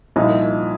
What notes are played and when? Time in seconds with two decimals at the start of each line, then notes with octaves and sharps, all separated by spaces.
0.16 C2 A#2 F3 D#4